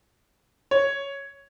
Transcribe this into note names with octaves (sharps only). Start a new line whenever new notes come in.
C#5